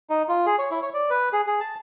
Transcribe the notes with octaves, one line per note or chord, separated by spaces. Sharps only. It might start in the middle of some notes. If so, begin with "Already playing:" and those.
D#4
F4
G#4
C#5
E4
C#5
D5
B4
G#4
G#4
A5